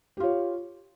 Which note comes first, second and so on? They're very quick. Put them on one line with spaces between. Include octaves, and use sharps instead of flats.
G4 F4 C#5